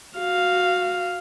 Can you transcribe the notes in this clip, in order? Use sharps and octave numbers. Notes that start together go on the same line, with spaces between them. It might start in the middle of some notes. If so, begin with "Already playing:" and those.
F#4 F5